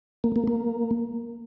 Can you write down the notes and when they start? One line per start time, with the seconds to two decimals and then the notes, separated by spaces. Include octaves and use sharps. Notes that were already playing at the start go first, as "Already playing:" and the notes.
0.24 A#3
0.36 A#3
0.47 A#3